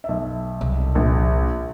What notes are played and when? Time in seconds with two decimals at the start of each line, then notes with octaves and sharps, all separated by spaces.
0.04 B1 E5
0.61 C2
0.95 A#1